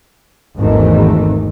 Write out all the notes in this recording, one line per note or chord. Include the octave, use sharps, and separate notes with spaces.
G#1 E2 G#2 D#3 A3